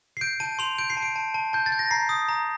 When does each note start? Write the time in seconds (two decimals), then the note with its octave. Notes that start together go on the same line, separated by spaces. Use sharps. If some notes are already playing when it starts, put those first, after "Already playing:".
0.17 C7
0.21 G6 D7
0.40 A5 D#7
0.59 C6 F7
0.78 G6 D7
0.90 C7
0.97 A5
1.02 D7
1.16 A5
1.34 A5
1.53 A5 G6
1.66 A6
1.72 G6
1.79 A#6
1.91 A#5 C7
2.09 D#6
2.29 A#5